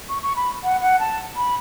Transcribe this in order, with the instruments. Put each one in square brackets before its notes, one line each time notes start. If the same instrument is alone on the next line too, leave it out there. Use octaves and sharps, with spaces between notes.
[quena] C#6
C#6
B5
F#5
F#5
A5
B5